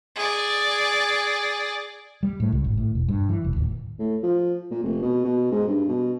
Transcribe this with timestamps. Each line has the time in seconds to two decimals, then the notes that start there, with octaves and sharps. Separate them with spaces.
0.16 G#4 D5
2.23 G3
2.40 A2
2.52 C#2
2.64 G#1
2.77 A2
2.95 E1
3.09 G2
3.29 E3
3.44 F1
3.56 D1
3.99 A2
4.23 F3
4.71 A#2
4.83 F1
5.02 B2
5.24 B2
5.51 G#2
5.68 G2
5.88 B2